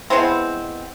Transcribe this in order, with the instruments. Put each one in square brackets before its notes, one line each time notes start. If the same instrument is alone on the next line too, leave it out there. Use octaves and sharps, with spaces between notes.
[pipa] E3 G#3 B3 C4